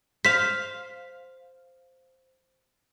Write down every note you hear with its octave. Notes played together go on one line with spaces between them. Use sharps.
C5 F5 B6